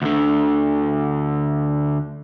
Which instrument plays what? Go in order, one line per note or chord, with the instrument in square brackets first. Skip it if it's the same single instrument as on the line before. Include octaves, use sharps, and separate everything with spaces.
[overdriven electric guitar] D2 D3